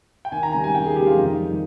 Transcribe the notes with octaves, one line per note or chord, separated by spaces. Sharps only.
G5
D#2 G#5
A#5
C#3 G3 G#5
G#5
D#2 G5
G#4
C#3 G3 G4
F4
F2 D#4
D#3 G3